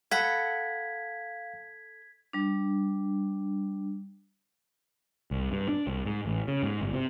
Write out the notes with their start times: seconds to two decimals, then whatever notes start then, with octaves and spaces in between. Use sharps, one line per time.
0.11 A4 F5 F#5 B5 G#6 B6
2.33 G3 D4
5.31 C2
5.52 G2
5.69 D4
5.87 C2
6.05 G#2
6.26 A1
6.48 C#3
6.63 G#2
6.81 G1
6.93 C3